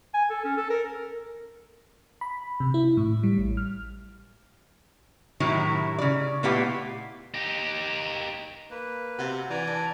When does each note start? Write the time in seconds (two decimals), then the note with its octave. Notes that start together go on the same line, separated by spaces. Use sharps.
0.14 G#5
0.30 A4
0.44 C#4
0.57 A4
0.70 A#4
2.21 B5
2.60 C3
2.74 E4
2.97 A2
3.23 G3
3.38 A1
3.57 F6
5.40 A2 C3 D#3 F#3 E4
5.98 C#3 D5
6.43 A#2 A3 B3 E4 G4 F5
7.34 D#4 G4
8.71 A#3 B4
9.19 C3 F#4 E5 F#5
9.50 E3 D5 G#5 A#5
9.67 D4